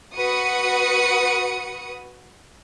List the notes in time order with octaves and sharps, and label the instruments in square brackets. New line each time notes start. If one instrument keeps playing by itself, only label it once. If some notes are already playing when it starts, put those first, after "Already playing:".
[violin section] F#4 B4 F#5 D#6 C#7